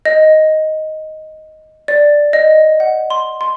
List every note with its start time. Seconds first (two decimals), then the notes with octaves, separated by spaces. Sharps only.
0.06 D#5
1.88 D5
2.33 D#5
2.80 F#5
3.10 C6
3.41 C6